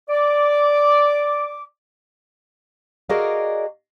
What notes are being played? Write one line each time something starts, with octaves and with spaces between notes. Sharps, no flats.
D5 D6
F#4 G#4 A#4 D5 D#5 F5